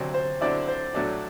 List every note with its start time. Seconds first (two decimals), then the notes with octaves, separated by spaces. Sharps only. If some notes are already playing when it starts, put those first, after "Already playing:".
Already playing: D2 C3 F#3 C4 D5
0.14 C5
0.41 D3 F#3 C4 E4 D5
0.68 C5
0.94 A2 F#3 A3 D4 D5